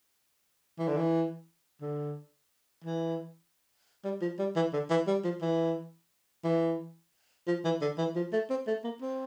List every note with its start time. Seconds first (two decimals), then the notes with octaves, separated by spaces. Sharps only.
0.79 E3
0.88 D3
0.97 E3
1.82 D3
2.84 E3
4.04 G3
4.21 F3
4.39 G3
4.56 E3
4.73 D3
4.90 E3
5.07 G3
5.24 F3
5.42 E3
6.44 E3
7.47 F3
7.65 E3
7.81 D3
7.98 E3
8.16 F3
8.33 A3
8.50 C4
8.67 A3
8.84 A#3
9.01 C4